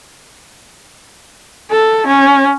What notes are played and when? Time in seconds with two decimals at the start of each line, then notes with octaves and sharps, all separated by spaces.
1.71 A4
2.07 C#4